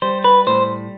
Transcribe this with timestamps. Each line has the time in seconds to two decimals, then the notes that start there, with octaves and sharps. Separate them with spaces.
0.02 G3 C5
0.24 B4
0.47 A2 C5